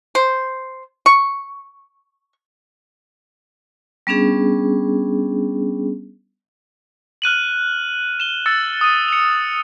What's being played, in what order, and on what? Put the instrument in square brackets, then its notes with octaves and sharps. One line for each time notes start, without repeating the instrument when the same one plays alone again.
[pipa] C5
C#6
[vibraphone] G3 B3 C#4 D4 G#4
[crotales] F6 F#6 D#7 F#7
E7 G7
E6 A6 C#7
D#6 D#7
C#7 F7